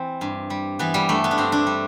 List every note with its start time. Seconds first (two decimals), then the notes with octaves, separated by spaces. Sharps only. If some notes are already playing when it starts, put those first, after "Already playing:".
Already playing: E3 C4
0.21 G2
0.50 G3
0.79 E3 B3
0.94 G3
1.09 G2 A3
1.24 B3
1.31 D4
1.38 G2 C4
1.52 D4
1.66 G3